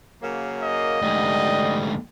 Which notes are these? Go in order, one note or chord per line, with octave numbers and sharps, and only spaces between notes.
C#3 F#3 A#3
D#5
D2 G#2 D3 G3